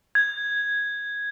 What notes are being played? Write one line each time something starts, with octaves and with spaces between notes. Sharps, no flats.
G#6